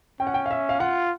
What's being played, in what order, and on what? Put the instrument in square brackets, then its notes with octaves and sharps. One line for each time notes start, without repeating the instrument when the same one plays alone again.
[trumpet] C#4 [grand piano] G5
[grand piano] F#5
G5
F5
E5
F5
[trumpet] F4 [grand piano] F#5